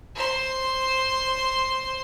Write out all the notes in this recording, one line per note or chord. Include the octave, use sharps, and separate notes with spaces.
C5 C6